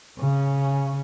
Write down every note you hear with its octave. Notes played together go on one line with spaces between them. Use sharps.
C#3 C#4